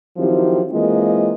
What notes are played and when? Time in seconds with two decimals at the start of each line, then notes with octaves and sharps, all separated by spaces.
0.18 D#3 F3 F#3 C4 E4 G4
0.72 E3 G#3 A#3 C4 F4 D#5